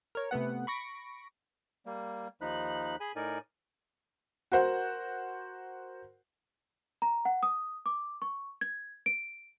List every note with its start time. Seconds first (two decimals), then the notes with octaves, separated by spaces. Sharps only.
0.15 A#4 C#5
0.31 C3 A3 B3 F#5
0.67 B5 C#6 A#6 D7
1.86 G3 A#3
2.41 D#2 F3 D#4 B5 F#6
3.00 G#4 G#5 B5
3.16 A2 D#4 A#4 D5 G#5
4.52 F#4 A#4 C5 F#5
7.02 A#5
7.25 F#5
7.43 D#6
7.86 D6
8.22 C#6
8.61 G#6
9.06 D7